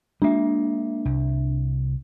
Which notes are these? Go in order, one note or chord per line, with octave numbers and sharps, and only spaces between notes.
G#3 A#3 D4 E5
C2